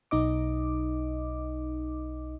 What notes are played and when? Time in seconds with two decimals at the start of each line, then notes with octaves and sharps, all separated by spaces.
0.11 B1 D#4 D#5 D6